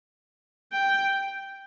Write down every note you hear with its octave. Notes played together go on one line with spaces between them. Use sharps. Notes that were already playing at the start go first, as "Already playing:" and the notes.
G5